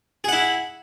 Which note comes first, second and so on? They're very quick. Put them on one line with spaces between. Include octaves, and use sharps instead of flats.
G#4 F#5 E4